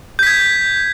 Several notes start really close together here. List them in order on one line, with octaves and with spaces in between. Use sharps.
G6 B6 G#6